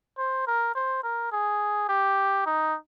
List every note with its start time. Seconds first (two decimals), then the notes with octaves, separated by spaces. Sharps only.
0.18 C5
0.47 A#4
0.75 C5
1.03 A#4
1.32 G#4
1.89 G4
2.46 D#4